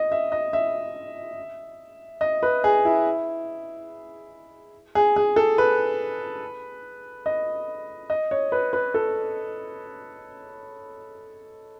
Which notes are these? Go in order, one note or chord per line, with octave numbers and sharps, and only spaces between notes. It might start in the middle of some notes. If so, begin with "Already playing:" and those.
Already playing: D#5
E5
D#5
E5
D#5
B4
G#4
E4
G#4
G#4
A4
B4
D#5
D#5
C#5
B4
B4
A4